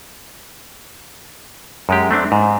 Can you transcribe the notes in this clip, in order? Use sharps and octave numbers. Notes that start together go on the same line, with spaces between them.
F#2 G#3 G4
A3 C4 D4
G#2